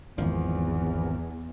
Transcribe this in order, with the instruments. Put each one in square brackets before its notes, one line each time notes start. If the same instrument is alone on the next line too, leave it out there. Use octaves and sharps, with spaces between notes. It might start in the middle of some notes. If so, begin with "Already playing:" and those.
[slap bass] G#1 F3 [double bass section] E2